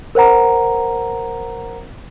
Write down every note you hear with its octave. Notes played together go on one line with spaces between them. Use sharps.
A#4 C5 F#5 A#5